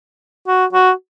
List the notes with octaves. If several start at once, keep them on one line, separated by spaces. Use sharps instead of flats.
F#4
F#4